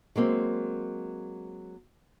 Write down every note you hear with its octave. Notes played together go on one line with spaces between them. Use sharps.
F#3 G#3 A#3 C4